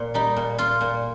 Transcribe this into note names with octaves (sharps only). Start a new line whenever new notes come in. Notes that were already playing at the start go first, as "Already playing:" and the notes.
Already playing: A#2
G3 D#4
A#2
A#2 F4
A#2